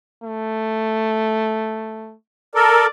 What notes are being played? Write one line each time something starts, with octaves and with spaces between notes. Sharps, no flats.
A3
A4 A#4 D5